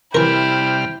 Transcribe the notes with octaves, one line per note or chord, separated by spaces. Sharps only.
C3 E3 G3 E4 A#4 G5 F6